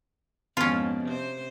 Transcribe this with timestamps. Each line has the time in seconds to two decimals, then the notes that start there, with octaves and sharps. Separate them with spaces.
0.57 F2 G#2 B2 C#4 F4
1.04 C3 C5